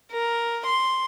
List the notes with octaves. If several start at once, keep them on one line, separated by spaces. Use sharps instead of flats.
A#4
C6